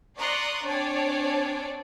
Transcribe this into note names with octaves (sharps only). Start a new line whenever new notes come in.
D5 A#5 C6 C#6 D#6 F#6
C4 D4 C#5 D5 G#5 A5